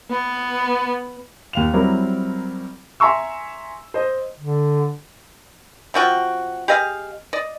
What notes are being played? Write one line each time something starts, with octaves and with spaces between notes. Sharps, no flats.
B3
D#2 F5 F7
F#3 G3 C4 E4 A#4
E5 G#5 A#5 C6 C#6 E6
C5 D#5
D3
C3 F3 F#4 G5
G4 G#4 D#5 F5
D5 D#5